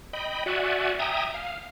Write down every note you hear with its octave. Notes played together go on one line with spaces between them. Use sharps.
D#5 G5 B5
F#4 D5 E5 F#5 G#5
E5 G5 G#5 A#5 D#6
F5